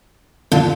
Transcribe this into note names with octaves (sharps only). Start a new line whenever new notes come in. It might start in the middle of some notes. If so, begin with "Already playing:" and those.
A#2 D3